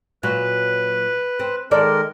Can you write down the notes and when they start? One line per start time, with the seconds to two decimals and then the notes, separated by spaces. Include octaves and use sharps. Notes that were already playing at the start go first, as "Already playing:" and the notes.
0.23 A#2 F#3 F#4 B4
1.40 C4
1.71 D#3 G#3 A4 A#4 D5